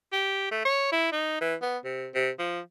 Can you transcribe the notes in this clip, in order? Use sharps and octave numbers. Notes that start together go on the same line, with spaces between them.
G4
A3
C#5
E4
D#4
E3
B3
C3
C3
F3